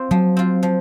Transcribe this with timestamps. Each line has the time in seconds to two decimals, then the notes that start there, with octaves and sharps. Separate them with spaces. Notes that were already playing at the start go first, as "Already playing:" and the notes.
Already playing: C4 F4
0.11 F3 F#3
0.37 C4 F4
0.63 F3